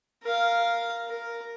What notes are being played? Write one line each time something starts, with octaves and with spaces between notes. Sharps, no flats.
A#4 F5
A#4